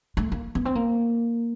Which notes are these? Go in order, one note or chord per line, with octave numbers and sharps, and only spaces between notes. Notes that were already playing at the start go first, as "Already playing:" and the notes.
A3
A#3
B3
C4
A#3